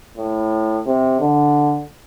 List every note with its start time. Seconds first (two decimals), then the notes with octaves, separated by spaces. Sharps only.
0.17 A2
0.86 C3
1.20 D3